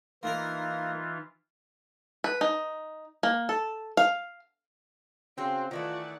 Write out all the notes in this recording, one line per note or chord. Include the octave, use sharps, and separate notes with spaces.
E3 A#3 D#4 F4 A#4
B4
D#4
A#3
A4
F5
C#3 C4 F#4 C5 G5
D#3 E3 A3 F4 D5 F#5